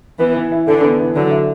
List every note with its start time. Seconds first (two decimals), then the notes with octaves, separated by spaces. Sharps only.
0.20 E3 B3
0.36 E3
0.52 E4
0.68 D3 E3
0.84 B3
0.99 E3
1.15 D3 F#3
1.31 E4